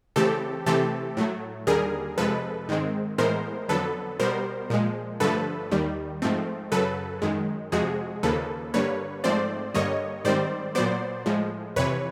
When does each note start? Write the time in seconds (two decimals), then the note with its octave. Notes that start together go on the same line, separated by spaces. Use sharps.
0.16 C#3 E3 A3 C4 G4 A4
0.66 C3 E3 A3 C4 G4 A4
1.17 A2 F#3 A3
1.67 D#2 D3 G3 G#4 A#4
2.17 F2 C3 F3 G#3 A4 B4
2.69 G#2 D#3 G#3 C4
3.18 A2 E3 G#3 B3 A#4 C5
3.69 F2 D3 F#3 B3 A4 B4
4.20 B2 G3 B3 A#4 C5
4.70 A#2 F3 G#3
5.20 G2 D3 F3 A3 A4 B4
5.71 D#2 D#3 G3
6.22 G#2 F3 A3 C4
6.72 F#2 C#3 F#3 A4 B4
7.22 F#2 D#3 G#3
7.72 F2 C3 F3 G#3 F#4 G#4
8.23 D#2 C#3 F3 A#3 A4 B4
8.74 G2 D3 G3 A#3 B4 C#5
9.24 G#2 F3 A3 C4 C5 D5
9.74 G2 D3 G3 A#3 C#5 D#5
10.25 G#2 D#3 G3 C4 C5 D5
10.75 A#2 F#3 B3 C5 D5
11.26 A2 F3 G#3
11.76 F2 C3 E3 B4 C#5